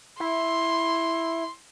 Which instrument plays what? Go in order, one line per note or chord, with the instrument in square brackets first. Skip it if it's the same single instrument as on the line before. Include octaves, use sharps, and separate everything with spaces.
[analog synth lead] E4 [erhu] C6